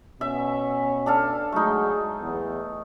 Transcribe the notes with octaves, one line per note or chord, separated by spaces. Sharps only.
B2 C#4 E5
D4 A4 F5
F#3 G#3 A3 D#4
E2